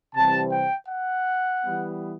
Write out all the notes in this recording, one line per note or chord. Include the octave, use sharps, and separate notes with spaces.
C3 E3 G3 C4 A5
G5
F#5
E3 G3 B3